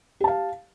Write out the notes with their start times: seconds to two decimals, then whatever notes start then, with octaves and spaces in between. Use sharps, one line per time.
0.20 G4
0.24 A5
0.28 F5